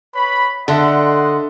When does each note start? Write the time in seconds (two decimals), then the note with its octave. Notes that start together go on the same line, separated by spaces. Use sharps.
0.14 B4 C#5 B5
0.68 D3 A4 D#5 E5 F#5 C6